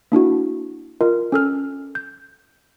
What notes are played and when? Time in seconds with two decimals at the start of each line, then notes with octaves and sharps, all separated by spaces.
0.12 A#3 D4 E4 F#4
1.01 F4 A#4 D#5
1.32 C#4 A4 F6
1.95 G6